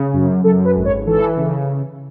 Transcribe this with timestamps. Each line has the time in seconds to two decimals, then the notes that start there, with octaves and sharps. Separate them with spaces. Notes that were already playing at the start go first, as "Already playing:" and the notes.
Already playing: C#3
0.13 F#2
0.44 F#2 A4
0.65 B4
0.76 G#1
0.85 C#5
1.06 E3 A4
1.37 C#3